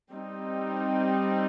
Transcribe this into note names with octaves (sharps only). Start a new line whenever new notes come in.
G3 C4 D#4